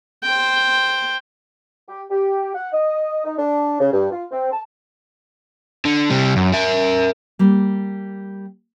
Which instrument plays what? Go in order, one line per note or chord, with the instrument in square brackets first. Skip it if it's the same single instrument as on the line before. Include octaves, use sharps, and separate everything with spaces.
[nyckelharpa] C5 G5
[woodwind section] G4
G4
F#5
D#5
D#4
D4
C#3
G2
F4
C4
A5
[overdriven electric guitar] D3
C3 G3
F#2
A#4 E5
[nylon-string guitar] G3 A#3